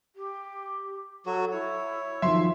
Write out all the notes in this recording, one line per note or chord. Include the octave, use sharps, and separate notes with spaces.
G4
F#3 F#4 A4
E4 C#5
D#3 F3 F#3 E5 C6